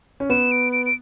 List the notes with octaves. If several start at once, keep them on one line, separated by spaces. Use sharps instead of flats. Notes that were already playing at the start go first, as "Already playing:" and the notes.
C#4
B3 E7
D7
D7
D7